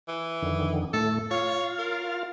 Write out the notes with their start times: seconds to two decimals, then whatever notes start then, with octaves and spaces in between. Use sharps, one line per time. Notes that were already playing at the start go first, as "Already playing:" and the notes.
0.08 E3
0.42 F2 D3 D#3
0.94 A2 A3 A4
1.31 F4 C#5 F5
1.78 A#4